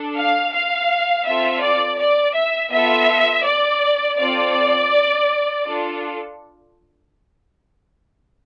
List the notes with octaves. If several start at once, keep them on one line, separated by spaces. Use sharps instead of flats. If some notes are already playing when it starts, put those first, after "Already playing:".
Already playing: D4 A4
F5
F5
C4 F4 A4 E5
D5
D5
E5
B3 F4 A4 E5
D5
C4 F4 A4 D5
D4 F4 A4